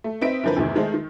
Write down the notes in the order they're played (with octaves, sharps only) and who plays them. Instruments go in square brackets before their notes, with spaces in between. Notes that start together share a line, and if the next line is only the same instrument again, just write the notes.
[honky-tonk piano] A3
C4 D#4 B4 E5 B6 D7
D3 E3 F3 A#4 B4
E2 G#2 C3 D#3
D#3 G#3 A3 A4 C5
D#3